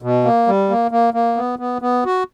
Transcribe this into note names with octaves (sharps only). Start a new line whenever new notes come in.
B2
A#3
G3
A#3
A#3
A#3
B3
B3
B3
F#4